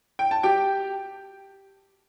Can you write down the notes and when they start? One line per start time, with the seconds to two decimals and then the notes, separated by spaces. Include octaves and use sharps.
0.19 G5
0.31 A5
0.43 G4 G5